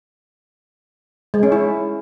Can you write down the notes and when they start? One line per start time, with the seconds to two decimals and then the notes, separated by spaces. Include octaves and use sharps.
1.34 G#3
1.43 C#4
1.52 E4